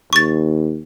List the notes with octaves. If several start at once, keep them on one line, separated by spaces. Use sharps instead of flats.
D#2 C#6 A6